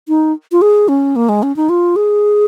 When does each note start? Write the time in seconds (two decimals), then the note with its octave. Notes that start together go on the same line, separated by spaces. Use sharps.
0.08 D#4
0.52 F4
0.62 G#4
0.88 C#4
1.16 A#3
1.29 G#3
1.43 C#4
1.56 D#4
1.69 F4
1.96 G#4